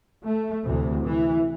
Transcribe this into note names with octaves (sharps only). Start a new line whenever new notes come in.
A3
D2 C3 E3
E3